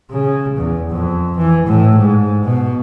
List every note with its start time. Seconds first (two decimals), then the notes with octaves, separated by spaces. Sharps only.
0.11 C#3
0.57 E2
0.91 F2
1.37 E3
1.67 A2
1.96 G#2
2.44 B2